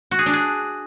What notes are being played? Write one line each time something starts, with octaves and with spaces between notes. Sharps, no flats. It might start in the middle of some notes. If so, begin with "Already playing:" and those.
F#4
G#4
D4
G#4